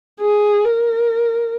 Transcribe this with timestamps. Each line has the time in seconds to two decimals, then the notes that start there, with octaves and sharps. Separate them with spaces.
0.21 G#4
0.65 A#4